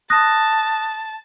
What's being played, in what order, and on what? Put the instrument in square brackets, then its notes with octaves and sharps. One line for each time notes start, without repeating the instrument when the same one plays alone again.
[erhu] A5 [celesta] D#6 F#6 A#6